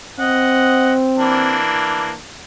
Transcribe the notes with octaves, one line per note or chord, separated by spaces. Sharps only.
C4 D#5 F#5
E3 A#3 D4